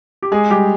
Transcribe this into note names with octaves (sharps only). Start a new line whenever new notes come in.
G4
G#3 G#4
G3 G4